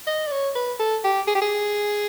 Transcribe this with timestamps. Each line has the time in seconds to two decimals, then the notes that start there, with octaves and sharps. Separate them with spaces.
0.07 D#5
0.27 D5
0.32 C#5
0.55 B4
0.79 A4
1.04 G4
1.27 G#4
1.35 G4
1.42 G#4